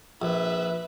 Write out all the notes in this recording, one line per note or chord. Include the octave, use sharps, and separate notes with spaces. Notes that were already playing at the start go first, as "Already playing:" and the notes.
A#1 B4 E5